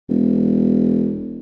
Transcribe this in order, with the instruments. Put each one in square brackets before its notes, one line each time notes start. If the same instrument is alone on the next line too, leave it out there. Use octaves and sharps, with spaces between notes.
[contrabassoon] E1